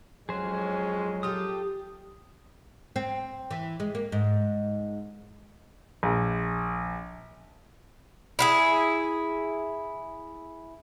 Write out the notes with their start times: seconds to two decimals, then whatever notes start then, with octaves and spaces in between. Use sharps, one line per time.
0.29 F2 F#3 G#3 C#4 G#4 C5
1.23 F4 G4 A4 D#6
2.96 C4
3.51 E3
3.80 G#3
3.95 A#3
4.12 G#2
6.03 A#1
8.39 E4 F4 G#4